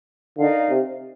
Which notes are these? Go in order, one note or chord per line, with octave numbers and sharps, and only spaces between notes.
D3 D#4 A#4 D5 F5
C3